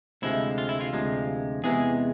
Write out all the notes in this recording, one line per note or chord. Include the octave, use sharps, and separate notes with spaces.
D2 C3 F3 G#3 E4
F4
E4
F4
D2 C3 F3 G#3
E2 C3 E3 G#3 G#4